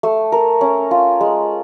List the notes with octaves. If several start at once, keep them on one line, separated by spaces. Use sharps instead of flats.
A3
A#4
C#4
F4
G#3